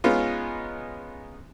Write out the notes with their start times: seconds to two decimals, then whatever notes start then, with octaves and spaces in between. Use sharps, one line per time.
0.04 G#3 B3 C#4 D#4 F4